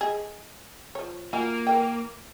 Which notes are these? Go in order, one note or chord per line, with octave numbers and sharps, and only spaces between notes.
G#3 G#4
F3 C#5
A#3 F4 F#4 G#5
E3 A#4 G5